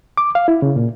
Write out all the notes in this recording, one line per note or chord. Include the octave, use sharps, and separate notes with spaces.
D6
F5
E4
C#3
A#2